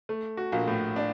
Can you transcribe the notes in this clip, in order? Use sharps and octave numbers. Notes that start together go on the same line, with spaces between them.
A3
F#4
A#1 A#2
A2
D4